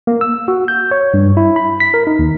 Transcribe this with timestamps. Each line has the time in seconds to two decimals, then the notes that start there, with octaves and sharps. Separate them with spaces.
0.07 A#3
0.21 E6
0.48 F#4
0.68 G6
0.91 C#5
1.14 G2
1.37 E4
1.56 B5
1.80 B6
1.94 A#4
2.07 D#4
2.19 D#2